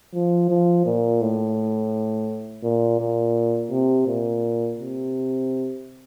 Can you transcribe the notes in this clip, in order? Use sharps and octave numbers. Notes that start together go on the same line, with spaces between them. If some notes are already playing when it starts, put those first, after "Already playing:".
F3
F3
A#2
A2
A#2
A#2
C3
A#2
C3